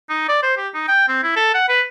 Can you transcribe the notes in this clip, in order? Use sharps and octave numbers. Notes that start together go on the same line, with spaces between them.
D#4
D5
C5
G4
D#4
G5
C4
E4
A4
F#5
B4